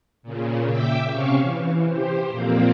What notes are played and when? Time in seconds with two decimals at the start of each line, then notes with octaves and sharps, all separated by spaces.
0.23 A#2 C#3
0.71 E5 G5 D6 E6
1.11 C3 C#4 F5 C#6
1.42 E3
1.87 G4 C5
2.28 F2 A#2 A#3 C4